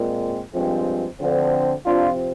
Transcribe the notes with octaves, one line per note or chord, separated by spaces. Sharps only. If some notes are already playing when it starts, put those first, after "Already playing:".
Already playing: A#2 G#3 C4
G2 F3 G#3 C4
D3 F3 C4
C3 F3 C4 D4 F4